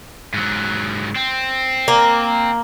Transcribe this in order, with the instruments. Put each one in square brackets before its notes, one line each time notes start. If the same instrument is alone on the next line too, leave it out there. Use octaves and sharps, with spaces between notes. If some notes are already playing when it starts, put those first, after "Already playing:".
[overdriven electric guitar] G#2 F#3
C4
[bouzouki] A#3